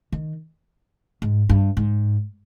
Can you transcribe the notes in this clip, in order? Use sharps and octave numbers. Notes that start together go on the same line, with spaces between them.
D#3
G#2
G2
G#2